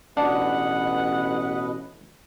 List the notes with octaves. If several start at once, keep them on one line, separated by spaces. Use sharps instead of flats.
A1 B2 D4 B4 D#5 F#5